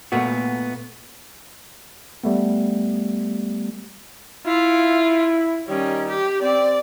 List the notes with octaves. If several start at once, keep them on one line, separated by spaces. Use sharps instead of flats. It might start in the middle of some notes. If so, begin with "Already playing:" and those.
A#2 A3 B3 F#4
G3 A3 B3
E4 F4
D#3 G3 C#4
G4
C4 D5